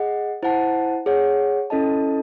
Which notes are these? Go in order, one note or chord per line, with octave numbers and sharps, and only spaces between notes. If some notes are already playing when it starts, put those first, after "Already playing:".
Already playing: G#4 D#5 F#5
E4 C5 F#5 A5
G#4 C#5 F#5
C#4 E4 A4 D#5 A5